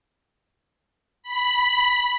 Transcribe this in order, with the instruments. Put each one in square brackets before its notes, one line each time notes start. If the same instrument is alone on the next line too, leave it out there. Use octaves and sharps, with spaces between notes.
[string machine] B5